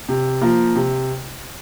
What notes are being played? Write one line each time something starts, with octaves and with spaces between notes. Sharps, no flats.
C3
F3 A#3
C3